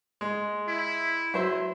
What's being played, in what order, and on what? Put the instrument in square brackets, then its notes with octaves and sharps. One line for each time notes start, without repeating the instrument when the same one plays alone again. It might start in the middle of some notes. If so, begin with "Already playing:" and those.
[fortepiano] G#3
[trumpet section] E4
[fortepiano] F#3 C5 E5